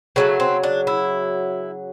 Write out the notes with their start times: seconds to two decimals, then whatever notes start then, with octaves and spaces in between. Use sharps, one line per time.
0.16 C#3 F#3 A3 B3
0.40 C4
0.63 D4
0.87 E4